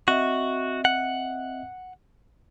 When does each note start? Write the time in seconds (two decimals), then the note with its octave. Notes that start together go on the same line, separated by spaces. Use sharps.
0.08 C4 F#4 D#5 E5
0.85 F#5